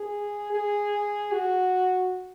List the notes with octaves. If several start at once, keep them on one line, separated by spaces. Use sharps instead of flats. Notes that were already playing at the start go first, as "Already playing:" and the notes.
Already playing: G#4
G#4
F#4